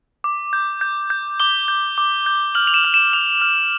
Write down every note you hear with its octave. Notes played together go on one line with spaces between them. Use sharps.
D6
G6
G6
G6
D6 G7
G6
D6
G6
F6 F#7
F7
E7
F6
E7
F6 F7
F6